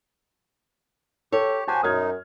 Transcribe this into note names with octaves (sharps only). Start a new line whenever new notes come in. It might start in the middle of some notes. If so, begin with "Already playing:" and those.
G4 A4 C#5
F#4 G4 C5 G#5 A5
F#2 D#4 D#6 F6 G#6